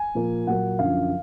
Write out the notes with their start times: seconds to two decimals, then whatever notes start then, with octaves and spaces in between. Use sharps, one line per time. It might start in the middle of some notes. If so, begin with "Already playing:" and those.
Already playing: G#5
0.15 A#2 F3 A#3
0.47 A#2 F#3 A#3 F#5
0.79 F#2 D3 F3 F5